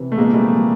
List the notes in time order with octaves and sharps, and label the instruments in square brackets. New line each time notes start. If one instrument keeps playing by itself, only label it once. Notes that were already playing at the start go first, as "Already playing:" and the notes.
Already playing: [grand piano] C3 E3
A3
A#2 G#3 A#3
G3 A3
F3